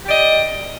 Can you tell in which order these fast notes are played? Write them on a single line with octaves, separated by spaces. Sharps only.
G4 D5 D#5